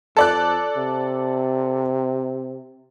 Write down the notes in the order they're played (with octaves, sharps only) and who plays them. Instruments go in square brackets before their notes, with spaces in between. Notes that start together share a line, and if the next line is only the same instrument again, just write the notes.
[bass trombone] F2 [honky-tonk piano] A4 D5 F#6
[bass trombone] C3